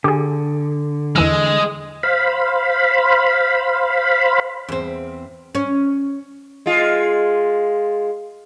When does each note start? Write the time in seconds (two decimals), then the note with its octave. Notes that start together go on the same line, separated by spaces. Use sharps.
0.04 D3 G4 G#4
1.16 E2 E3 G#3 E6
2.03 C5 F5 B5
4.68 E2 C4
5.55 C#4
6.66 G#3 F4